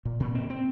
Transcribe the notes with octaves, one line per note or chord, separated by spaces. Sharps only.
A#2
A#2
C4
C4